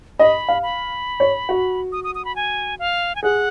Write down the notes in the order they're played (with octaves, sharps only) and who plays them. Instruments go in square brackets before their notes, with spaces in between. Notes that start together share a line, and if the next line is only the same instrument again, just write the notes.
[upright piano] D#5 [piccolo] B5
[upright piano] F5
[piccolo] B5
[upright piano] C#5
F#4
[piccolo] D#6
D#6
D#6
B5
G#5
F5
G#5
[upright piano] G#4 [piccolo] F#5